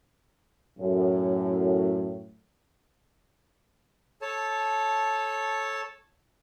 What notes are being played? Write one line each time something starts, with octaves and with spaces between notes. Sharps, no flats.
F#2 A2
A4 C#5 A5